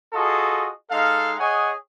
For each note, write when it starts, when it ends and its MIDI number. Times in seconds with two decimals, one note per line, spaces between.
0.13 0.69 65
0.13 0.69 66
0.13 0.69 68
0.13 0.69 69
0.13 0.69 75
0.91 1.35 56
0.91 1.35 63
0.91 1.35 69
0.91 1.35 77
1.39 1.71 68
1.39 1.71 73
1.39 1.71 75
1.39 1.71 78
1.39 1.71 80